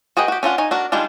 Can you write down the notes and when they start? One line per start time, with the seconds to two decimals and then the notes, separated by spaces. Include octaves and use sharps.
0.17 F#4 G#4 B4 D#5 G5
0.28 F#4 G4
0.43 C#4 D4 F4 F#5
0.58 D#4 C#5 G#5
0.71 D4 F#4 A#4
0.92 D#3 G3 G#3 D4 F4